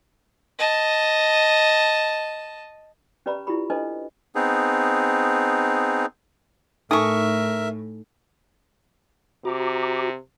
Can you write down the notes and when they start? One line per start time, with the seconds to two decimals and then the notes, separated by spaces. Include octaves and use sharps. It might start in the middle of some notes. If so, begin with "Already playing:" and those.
0.59 D#5 A5
3.26 C#4 G4 B4 D5 A#5 B5
3.47 E4 F4 G4 B5
3.70 D4 A4 B4 C5 D#5 A5
4.35 B3 C4 D#4 G#4
6.91 A2 D#4 A4 A#4 E5 G#5 C#6 D#6
9.45 C3 F#4 A#5 D6